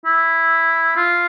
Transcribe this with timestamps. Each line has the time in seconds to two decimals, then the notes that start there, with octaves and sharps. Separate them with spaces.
0.06 E4
0.96 F4